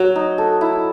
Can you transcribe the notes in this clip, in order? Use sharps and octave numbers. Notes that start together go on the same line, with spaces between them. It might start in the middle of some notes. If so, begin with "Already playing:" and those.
Already playing: F#3
D#4
A4
E4